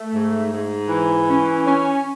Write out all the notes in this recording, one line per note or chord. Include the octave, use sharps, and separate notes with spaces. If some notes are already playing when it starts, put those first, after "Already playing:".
Already playing: A3
G#2
G#2
E3
C#4
C#4